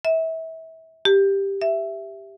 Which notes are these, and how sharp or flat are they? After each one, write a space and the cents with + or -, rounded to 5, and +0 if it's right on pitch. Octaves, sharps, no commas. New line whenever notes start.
E5 -30
G4 +5
E5 +5